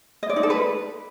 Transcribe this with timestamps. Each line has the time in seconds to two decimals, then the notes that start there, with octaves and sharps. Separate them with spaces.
0.23 D#5
0.29 D5
0.36 D#4
0.43 A4
0.50 B4